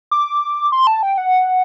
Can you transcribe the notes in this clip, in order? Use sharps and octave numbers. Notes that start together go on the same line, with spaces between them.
D6
C6
A5
G5
F#5